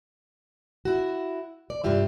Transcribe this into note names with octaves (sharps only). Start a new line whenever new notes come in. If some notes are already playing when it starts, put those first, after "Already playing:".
E4 F#4
D5
G2 C3 F4 G4 E5